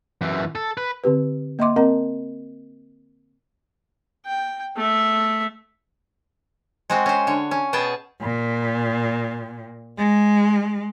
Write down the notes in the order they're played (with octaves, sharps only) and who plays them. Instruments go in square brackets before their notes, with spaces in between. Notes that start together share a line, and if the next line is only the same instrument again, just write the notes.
[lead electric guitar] F#2 E3
A4
B4
[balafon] D3 C4 G4 B4
A#3 D#5 E5 C6 D6
C4 A#4 D#5 F#5 A#5
[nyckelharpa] G5
A3 E5
[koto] G#3 C4 F#4
C#4 C5
D3 C#5
C#4
B2 B3 G#4 G5 A5
[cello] A#2
G#3